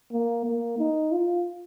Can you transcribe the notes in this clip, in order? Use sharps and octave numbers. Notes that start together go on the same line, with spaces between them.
A#3
A#3
D#4
F4